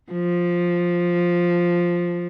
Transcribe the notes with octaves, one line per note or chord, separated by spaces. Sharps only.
F3